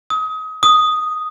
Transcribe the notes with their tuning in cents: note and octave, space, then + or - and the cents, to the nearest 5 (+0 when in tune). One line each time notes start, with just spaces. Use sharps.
D#6 +30
D#6 +0